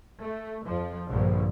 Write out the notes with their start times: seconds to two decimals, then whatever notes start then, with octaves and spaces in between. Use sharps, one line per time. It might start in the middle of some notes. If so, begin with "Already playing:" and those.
0.21 A3
0.65 F2 F3
1.07 A#1 G2 D3 F3